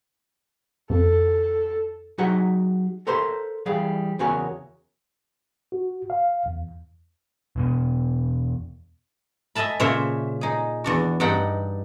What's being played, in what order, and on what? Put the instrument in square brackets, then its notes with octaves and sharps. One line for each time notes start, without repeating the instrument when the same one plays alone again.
[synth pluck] F2 [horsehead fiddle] A4
[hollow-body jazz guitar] F#3 D#4 F#4 G#4 E5 F#5
A4 A#4 C5 E5 C6
E3 G3 G#4 F5
E2 C#3 F#4 A#4 C#5 G#5
[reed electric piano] F#4
F5
E2
[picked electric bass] E2 B2 B3
[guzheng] D#5 E5 G#5 A5 B5
A#2 C#3 C5 C#5 E5
D#4 G#4
E2 D4 F#4
G2 D4 D#4 F#5 G5